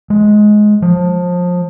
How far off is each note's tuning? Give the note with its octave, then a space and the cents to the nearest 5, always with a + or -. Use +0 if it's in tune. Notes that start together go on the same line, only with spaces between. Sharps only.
G#3 +15
F3 +25